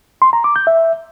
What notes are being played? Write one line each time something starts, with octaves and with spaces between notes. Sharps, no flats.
C6
A#5
D6
G6
E5